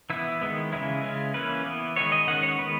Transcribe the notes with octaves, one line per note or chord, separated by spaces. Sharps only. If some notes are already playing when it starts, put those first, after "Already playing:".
E3 B3 E4
D#3 G#3 B3
C#3 E3 G#3 C#4 E4
C#3 G#3 C#4
E3 A#3 C#4 B4
E3 B3
D#3 G#3 B3 C#5
D#5
D#3 G#3 C#4 F#5
C#5
D#3 G#3 B3 B4